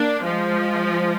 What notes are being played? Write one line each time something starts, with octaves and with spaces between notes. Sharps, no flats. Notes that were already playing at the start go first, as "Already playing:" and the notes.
Already playing: A#3 D4
F3 G#3